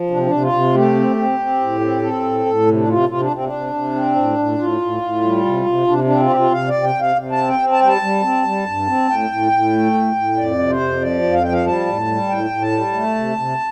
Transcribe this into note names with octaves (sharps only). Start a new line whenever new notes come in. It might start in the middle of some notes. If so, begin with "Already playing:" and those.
Already playing: F3
C3 D4
C4
D4
C3
F4
C3
A3 G4
C4
C4
C4
A2
C4
C4 A4
A2
A2
C3
D4
C3 F4
C3 F4
D4
C3 C4
D4
C3
C3
C4
A2
A2
A2 F4
A2
A2
G3
C3
C3
C3 D4
D4
C4
F4
C3 G4
F4
C3 F5
D5
C3
G5
C3
F5
C3
A5
C4
G5
C4
A5
G3 G5
A5
G3
C4
G3
G2
C4
A2 G5
A2
A2
A3
A2
A2
F2 D5
C3
C5
F2
F3 D5
F2
F5
F3 G5
F5
G3 A5
A2
G3
A2 G5
A2
A5
G3
A3
C3
C3